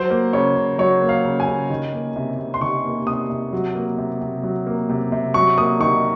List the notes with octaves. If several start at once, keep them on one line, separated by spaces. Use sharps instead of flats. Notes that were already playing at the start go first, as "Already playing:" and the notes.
Already playing: F#3 C5
A#3
C#3 C#5
C#3
F#3 C#5
A#3
F5
C#3
G#5
C#3
D#3
A#3
C3
C3
C6
D#3 C#6
A#3
C3 D#6
C3
F#3
A#3
C3
C3
F#3
A#3
C3
C3
F#3 C#6
A#3 D#6
D#3 C#6